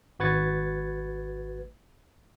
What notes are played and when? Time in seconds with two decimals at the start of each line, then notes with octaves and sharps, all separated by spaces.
0.19 G#1 F#4 B4 G#6 A6 C#7